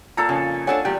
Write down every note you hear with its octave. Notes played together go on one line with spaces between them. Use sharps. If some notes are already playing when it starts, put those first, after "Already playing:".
A#2 A4 F5 A#5 E6
F2 C#3
D4 A4 C#5 F#5 G#5
E2 G3 G5